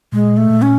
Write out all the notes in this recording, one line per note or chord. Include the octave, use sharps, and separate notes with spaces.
A#2 G#3
A3
A#2
C#4